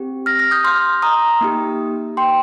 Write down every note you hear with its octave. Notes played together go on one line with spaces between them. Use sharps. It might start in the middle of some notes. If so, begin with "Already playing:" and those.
Already playing: C4 G4
F6 A#6
F6 A#6
D#6 G6
C6 F6
A#5 D#6
A#3 D#4 G4
G5 C6